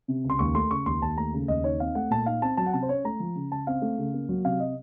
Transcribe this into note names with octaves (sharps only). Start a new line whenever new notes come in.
C3
C#2
C6
D#2 C#6
A3 C6
C#3 C#6
D#2 C6
D#2 A5
A3 A#5
C#3
D#2 D#5
D#4 C#5
C4 F5
A3 F#5
A#2 A5
D#4 F5
C4 A5
F#3 A5
F#5
C3 A5
C5
C#4 C#5
A3 A#5
F3
C#3
C#3 A5
C4 F5
A3
C#3
A#3
F#3
C3 F5
D#5